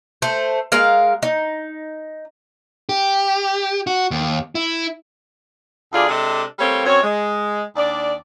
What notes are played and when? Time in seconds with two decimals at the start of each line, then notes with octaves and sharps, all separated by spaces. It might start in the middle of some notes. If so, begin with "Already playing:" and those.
0.22 A3 C5
0.72 G#3 A#4 F5
1.23 D#4
2.89 G4
3.87 F#4
4.11 D#2
4.55 E4
5.92 D2 F4 G#4 D5
6.08 C3 G#3 D4 A4 D#5
6.58 G3 A3 A#3 C4 C#5
6.85 F#2 C4 C#5
7.02 G#3
7.75 D#2 D4 D5